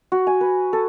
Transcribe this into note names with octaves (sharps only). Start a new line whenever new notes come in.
F#4
G#5
B4
A4